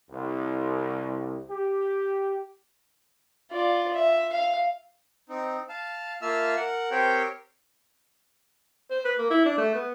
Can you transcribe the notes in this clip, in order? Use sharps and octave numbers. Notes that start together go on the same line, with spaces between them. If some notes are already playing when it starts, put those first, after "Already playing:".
C2
G4
F4 D5
E5
F5
C4 D#4
F5 A5
A#3 F4 E5 A5 E6 F6
A#4 F#5
C4 G4 A#4 C5 C#5 G5
C5
B4
A#3
E4
D4
A3
B3